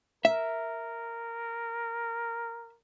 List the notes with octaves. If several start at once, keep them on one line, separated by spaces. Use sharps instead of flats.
A#4 E5